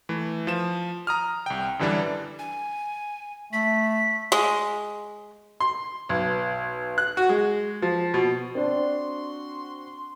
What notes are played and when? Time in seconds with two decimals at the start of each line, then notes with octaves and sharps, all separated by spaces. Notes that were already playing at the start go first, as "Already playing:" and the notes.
0.09 E3 A3
0.47 F3 E7
1.07 A#5 D#6 F6
1.46 C2 G5
1.79 F#2 D3 E3 G3 D4
2.39 G#5
3.53 A3 B6
4.32 G#3
5.60 C6
6.09 B1
6.98 F#6
7.17 F#4
7.29 G#3
7.82 F3
8.14 B2
8.55 C4 D4 F#4 C6